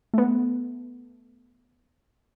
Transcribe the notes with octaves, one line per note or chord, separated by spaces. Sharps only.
A3 B3